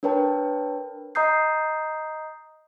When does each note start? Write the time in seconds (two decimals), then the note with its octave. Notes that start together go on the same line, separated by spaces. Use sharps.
0.03 D4 A#4 B4 C#5 G5 A5
1.15 D#5 A#5 D#6 G6 C7